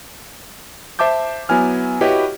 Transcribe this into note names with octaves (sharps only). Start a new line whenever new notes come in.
C5 E5 A5 D6 G6
F#3 B3 E4 G#5 F6
E4 F#4 G4 B4 C#5 D#5